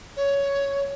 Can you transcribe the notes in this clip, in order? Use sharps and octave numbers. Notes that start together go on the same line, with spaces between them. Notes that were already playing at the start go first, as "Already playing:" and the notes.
C#5